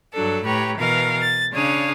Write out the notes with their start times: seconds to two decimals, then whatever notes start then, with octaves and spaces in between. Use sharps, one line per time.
0.13 G2 F#3 D4 A4
0.42 A2 G4 B4 C#5 A#5
0.76 B2 E3 A#4 F5
1.20 A6
1.51 C#3 D4 C#5 F5 D#6